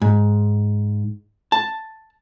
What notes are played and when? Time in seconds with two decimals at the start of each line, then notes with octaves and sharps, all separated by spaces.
0.02 G#2
1.52 A5